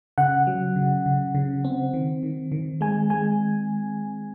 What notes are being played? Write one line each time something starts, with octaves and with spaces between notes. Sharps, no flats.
C#3 F#5
F#3
C#3
C#3
C#3
C4
D#3
D#3
D#3
G#3 G#5
G#3 G#5